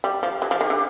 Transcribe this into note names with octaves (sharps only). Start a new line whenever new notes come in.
G3 G4
F3 G4
F#3 G4
F3
D#3 G4
D3